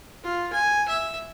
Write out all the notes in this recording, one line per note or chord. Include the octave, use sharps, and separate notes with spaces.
F4
G#5
E5